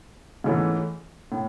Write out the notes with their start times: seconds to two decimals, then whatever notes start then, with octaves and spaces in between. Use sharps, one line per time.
0.44 G#2 E3 A3 C#4
1.32 A2